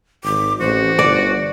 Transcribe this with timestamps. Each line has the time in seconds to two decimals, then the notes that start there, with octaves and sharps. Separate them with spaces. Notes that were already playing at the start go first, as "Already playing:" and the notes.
0.24 G#1 D6
0.60 A1 F#4 C5
0.99 G1 D5